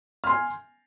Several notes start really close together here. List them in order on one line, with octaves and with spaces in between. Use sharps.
F6 C6 G#5